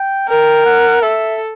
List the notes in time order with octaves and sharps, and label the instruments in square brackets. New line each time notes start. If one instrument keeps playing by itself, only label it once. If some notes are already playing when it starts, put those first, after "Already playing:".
Already playing: [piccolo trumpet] G5
[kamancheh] A#4 [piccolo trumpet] G5
[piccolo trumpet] F#5
[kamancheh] A4 [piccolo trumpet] E5